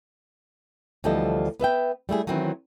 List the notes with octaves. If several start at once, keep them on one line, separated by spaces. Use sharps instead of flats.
D2 E3 F3 G3 A4 D#5
B3 B4 E5 G5
G3 A3 E4 G#4
D#3 E3 F#3 C4 C#4 E4